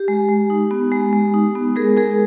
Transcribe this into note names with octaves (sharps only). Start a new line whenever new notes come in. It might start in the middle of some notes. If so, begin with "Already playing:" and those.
Already playing: G4
G#3
G#3
D#4
B3
G#3
G#3
D#4
B3
G#3 G#4 A#4
G#3 G#4 A#4